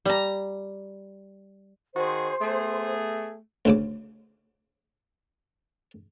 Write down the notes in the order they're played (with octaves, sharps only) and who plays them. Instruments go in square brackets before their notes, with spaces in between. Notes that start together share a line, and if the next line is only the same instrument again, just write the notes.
[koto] G3 A#5
[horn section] D#3 F#4 G#4 [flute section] C5
[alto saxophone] A3 [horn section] B3 G#4
[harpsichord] D2 C#3 D6